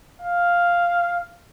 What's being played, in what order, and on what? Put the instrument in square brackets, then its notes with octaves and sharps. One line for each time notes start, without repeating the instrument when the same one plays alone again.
[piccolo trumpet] F5